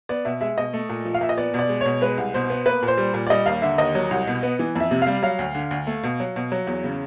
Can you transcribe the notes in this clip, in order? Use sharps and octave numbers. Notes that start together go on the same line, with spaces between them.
B3 D5
B2 E5
G#3 E5
B2 D#5
A3
A#2
F3
F5
A#2 E5
D#5
B3 D5
B2 D5
G#3
B2 C#5
G#3 B4
C2
B2 C5
B3
A#3 B4
A#2
C5
G3
A#2
D5
G3 D#5
D#2 F5
D3 E5
D#2 D#5
F#3
C2
B2
B3
E3
F2 E5
C3
G3 F5
F#3 F5
D2
D3
D2
A3
B2
F#3
B2
F#3
E2
C#3